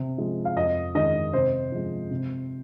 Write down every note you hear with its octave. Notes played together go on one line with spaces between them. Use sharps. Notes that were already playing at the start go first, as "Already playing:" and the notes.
Already playing: C3
F3 G#3
F5
F2 D#5
D#3 G#3 D#5
C3 C5
F3 G#3
C3